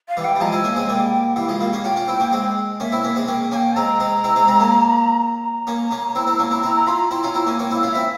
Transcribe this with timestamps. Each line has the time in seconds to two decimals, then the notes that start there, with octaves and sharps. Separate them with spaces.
0.08 F5
0.17 E3 G3
0.24 G5
0.36 G3
0.40 F3 G#3 A#5
0.45 G#5
0.52 C4 E4
0.64 A#3 C#4
0.76 G#3 C4
0.89 G3 A#3 G#5
0.93 G5
1.36 E3 G3 F5
1.48 F3 G#3
1.60 G3 A#3 F5
1.73 A#3 C#4
1.84 C#4 F4 G5
1.96 C#4 F4
2.08 C4 E4
2.20 A#3 C#4
2.32 G#3 C4
2.80 A#3 C#4 E5
2.92 C4 E4
3.04 A#3 C#4
3.16 G#3 C4
3.28 A#3 C#4 G5
3.51 A#3 C#4 G5 G#5
3.76 G#3 C4 A#5
4.00 G#3 C4
4.24 C4 E4
4.36 G#3 C4
4.48 G#3 C4
4.60 A#3 C#4
5.20 A#5
5.67 A#3 C#4
5.91 A#3 C#4
6.15 C4 E4
6.27 C4 E4
6.39 A#3 C#4
6.51 C4 E4
6.63 C4 E4 A#5
6.75 A#5
6.87 C#4 F4 C6
6.99 A#5
7.11 C4 E4 C6
7.23 C#4 F4 A#5
7.34 C4 E4 A#5
7.46 A#3 C#4 G#5
7.59 A#3 C#4 G5
7.71 C4 E4 F5
7.83 C#4 F4
7.91 C4 E4 E5